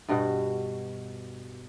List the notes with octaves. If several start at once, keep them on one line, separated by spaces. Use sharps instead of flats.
G2 B2 F#4